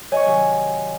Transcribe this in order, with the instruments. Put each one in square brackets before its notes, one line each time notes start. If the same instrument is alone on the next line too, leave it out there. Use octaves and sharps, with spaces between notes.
[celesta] C#5 D#5 [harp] G#5 C#6
[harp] C3 D#3 F#3